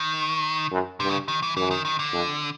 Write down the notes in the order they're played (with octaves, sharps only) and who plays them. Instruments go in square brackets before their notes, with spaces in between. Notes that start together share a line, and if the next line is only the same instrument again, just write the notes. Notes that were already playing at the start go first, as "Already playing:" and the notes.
Already playing: [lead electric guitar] D#3
[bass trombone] F#2
[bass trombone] G2 [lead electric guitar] C3
[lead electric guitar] C#3
D#3
E3
[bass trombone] F#2 [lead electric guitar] E3
[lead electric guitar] D#3
D#3
D3
[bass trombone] F2